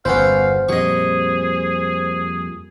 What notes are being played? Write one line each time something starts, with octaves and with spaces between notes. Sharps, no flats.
G1 E2 B3 C#4 E4 C5 F5
F2 A#2 G3 G#4 D#5 C#6